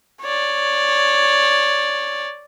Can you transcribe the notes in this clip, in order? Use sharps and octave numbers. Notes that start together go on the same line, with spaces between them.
C#5 D5